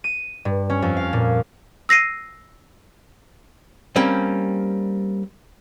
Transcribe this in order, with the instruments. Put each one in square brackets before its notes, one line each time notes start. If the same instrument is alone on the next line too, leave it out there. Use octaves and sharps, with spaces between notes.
[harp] D#7
G2
C#4
F2
F5
A#2
[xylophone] E6 A#6 C7 D#7
[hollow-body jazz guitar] G3 A#3 C4 C#4